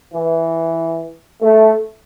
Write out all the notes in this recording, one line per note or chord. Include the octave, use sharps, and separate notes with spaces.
E3
A3